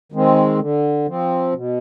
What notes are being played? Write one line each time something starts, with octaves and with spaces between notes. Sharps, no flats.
D#3 G#3 C4
D3
F3 C4
B2